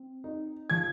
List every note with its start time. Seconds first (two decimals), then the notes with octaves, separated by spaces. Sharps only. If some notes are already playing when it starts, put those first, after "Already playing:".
Already playing: C4
0.24 D#4
0.70 F3 G#6